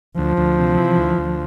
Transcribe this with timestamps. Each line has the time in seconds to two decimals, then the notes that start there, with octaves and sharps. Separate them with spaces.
0.18 D2 F3
0.37 D2
0.58 C3
0.77 E3
0.97 D2
1.18 D2